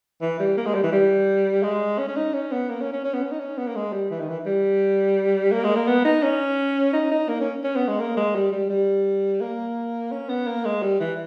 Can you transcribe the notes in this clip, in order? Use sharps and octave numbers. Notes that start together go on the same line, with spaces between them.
E3
G3
A#3
G#3
G3
E3
G3
G#3
C#4
C#4
D#4
C#4
B3
A#3
C#4
C#4
C#4
B3
C#4
D#4
C#4
B3
A#3
G#3
G3
E3
D#3
E3
G3
A#3
G#3
A#3
B3
D#4
C#4
D#4
D#4
A#3
C#4
C#4
B3
G#3
A#3
G#3
G3
G3
G3
A#3
C#4
B3
A#3
G#3
G3
E3